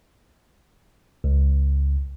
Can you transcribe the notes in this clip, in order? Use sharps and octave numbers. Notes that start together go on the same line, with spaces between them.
C#2